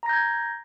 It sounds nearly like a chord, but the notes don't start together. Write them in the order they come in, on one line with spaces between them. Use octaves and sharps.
A#5 A#6 G6 G#6